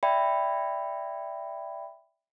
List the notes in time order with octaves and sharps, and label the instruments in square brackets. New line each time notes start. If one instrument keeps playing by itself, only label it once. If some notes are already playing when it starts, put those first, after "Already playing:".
[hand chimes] D5 E5 G5 B5